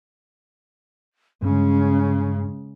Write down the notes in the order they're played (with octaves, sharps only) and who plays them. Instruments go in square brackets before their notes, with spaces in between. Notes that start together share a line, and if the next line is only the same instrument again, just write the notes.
[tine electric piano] G2 [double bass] C#3 G#3 [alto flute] C#4